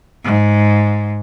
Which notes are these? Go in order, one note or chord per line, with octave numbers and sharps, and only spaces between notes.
G#2